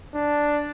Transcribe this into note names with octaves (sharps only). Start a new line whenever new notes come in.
D4